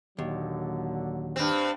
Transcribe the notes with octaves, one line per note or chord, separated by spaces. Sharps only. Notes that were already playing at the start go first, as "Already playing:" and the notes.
D#2 A#2 D3 F#3
G2 C4